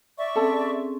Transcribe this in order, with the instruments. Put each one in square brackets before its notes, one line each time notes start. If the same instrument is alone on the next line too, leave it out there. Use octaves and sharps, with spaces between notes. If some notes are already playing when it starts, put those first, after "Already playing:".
[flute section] D5 E5 C#6
[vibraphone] C4 C#4 G#4 [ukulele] A4 A5